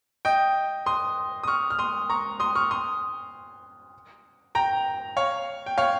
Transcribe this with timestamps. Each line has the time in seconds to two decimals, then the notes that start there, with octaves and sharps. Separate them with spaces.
0.25 D#5 G5
0.86 C6 D#6
1.44 D#6
1.48 C#6 F6
1.70 F6
1.79 C6 D#6
2.10 A#5 C#6
2.40 C6 D#6
2.55 C#6 F6
2.71 C6 D#6
4.55 G5 A#5
5.17 C#5 F5
5.66 G5
5.78 C#5 F5